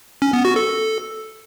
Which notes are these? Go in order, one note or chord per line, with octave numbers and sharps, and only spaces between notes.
C#4
B3
F#4
A4